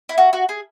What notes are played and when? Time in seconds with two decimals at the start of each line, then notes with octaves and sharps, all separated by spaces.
0.09 E4
0.18 F#4
0.33 F#4
0.49 G#4